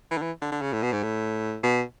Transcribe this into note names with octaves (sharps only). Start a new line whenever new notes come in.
E3
D3
E3
D3
D3
C#3
A2
B2
G#2
A2
B2